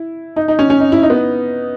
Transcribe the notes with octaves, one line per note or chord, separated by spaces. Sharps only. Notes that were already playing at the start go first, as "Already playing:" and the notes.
Already playing: E4
D#4
D#4
C#4
C#4
D#4
E4
D#4
B3